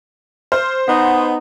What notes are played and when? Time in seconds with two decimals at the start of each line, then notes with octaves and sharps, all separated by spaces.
0.52 C5 F6
0.88 B3 D#4 F#5